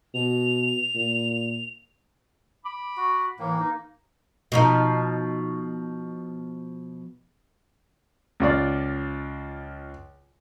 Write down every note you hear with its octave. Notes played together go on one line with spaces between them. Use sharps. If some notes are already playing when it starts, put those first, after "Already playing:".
B2 F7
A#2
B5 D6
F#4
A2 E3 A#3
D#4
B2 F3 D#4
C#2 F4 D5